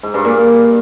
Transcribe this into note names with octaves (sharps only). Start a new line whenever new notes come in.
G#2
G2
A#2